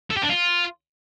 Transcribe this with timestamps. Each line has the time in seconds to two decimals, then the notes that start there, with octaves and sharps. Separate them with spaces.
0.10 A4
0.17 G4
0.23 D4
0.30 F4